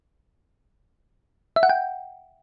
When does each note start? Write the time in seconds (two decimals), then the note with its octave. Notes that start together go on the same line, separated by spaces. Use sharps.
1.56 E5
1.63 F#5
1.69 G5